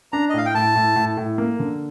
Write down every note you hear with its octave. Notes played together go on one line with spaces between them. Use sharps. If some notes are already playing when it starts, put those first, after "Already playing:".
D4 A#5
D#5
A2 F5
G5
A2 A5
A2
A2
A2
A#3
D3